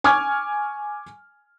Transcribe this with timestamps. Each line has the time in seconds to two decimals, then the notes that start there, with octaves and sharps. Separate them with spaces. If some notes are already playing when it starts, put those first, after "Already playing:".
0.04 G#5 C#6 D6 F6 G#6